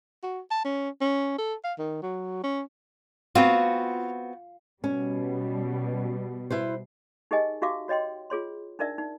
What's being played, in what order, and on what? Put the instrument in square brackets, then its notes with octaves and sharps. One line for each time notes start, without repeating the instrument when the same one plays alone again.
[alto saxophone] F#4
A5
C#4
C#4
A4
F5
D#3
F#3
C#4
[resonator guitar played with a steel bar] B3 C4 F#4 [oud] F4
[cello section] B2 G3 [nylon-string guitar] C#4
[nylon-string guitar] E4 B4 C5
[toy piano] D#4 G4 G#4 A#4 D#5 G#5
D#4 F#4 G4 E5 F5 D6
F#4 C#5 D#5 G5 C6
F4 G#4 C#5 C6
D4 D#4 A#4 D5 E5
D#4